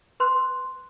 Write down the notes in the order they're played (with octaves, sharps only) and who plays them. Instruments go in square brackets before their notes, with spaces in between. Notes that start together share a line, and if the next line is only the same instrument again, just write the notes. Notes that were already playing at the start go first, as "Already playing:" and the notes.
[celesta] B4 C6 F#6